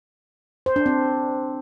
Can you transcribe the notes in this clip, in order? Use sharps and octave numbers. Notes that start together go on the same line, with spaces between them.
C5
D4
C4